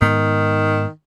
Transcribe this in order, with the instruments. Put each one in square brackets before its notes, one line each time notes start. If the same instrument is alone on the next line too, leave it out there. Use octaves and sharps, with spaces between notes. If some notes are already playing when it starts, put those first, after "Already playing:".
[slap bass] G#2 B3 [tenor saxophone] D#3